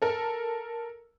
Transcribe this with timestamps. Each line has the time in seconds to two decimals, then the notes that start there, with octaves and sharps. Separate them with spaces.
0.02 A4 A#4